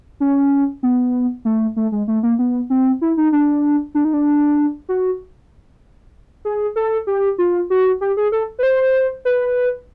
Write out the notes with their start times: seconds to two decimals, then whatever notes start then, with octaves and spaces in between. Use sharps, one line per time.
0.20 C#4
0.83 B3
1.45 A3
1.76 A3
1.92 G#3
2.08 A3
2.23 A#3
2.39 B3
2.70 C4
3.01 E4
3.17 D#4
3.32 D4
3.95 D4
4.05 D#4
4.13 D4
4.89 F#4
6.45 G#4
6.76 A4
7.07 G4
7.38 F4
7.70 F#4
8.01 G4
8.17 G#4
8.32 A4
8.59 B4
8.63 C5
9.25 B4